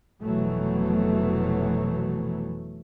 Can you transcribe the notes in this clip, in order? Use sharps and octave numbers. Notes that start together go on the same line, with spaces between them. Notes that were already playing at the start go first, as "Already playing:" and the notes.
F1 B2 E3 F#3 A3